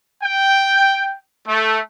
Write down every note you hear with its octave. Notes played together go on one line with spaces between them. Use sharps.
G5
A3